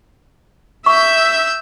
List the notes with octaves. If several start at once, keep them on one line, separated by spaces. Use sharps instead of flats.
E5 C#6 E6 G6